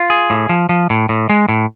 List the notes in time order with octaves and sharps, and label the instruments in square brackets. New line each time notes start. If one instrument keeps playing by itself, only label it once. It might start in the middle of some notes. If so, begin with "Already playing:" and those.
Already playing: [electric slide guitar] F4
G#4
A2
F3
F3
A2
A2
G#3
A2